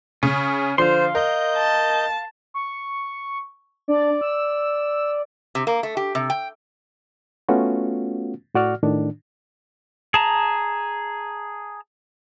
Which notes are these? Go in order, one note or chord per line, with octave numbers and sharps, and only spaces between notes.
C#3 C#4
D3 F3 C5 F5 C6
A#4 D#5 G6
A5
C#6
D4 D5
E6
C3
A#3
A3
G4
C3
G5
A3 B3 C#4 F4 F#4
A2 F#4 D5 F6
A2 D#3 D4
G#4 A5 A#5